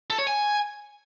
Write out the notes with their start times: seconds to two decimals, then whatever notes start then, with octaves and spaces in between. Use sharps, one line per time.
0.10 A4
0.18 C#5
0.27 G#5